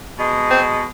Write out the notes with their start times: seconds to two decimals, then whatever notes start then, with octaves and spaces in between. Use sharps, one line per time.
0.19 B2 G#3
0.51 C4